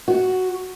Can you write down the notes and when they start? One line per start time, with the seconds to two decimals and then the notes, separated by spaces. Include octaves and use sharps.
0.08 F#4